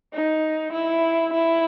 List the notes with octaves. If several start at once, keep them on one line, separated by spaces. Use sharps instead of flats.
D#4
E4
E4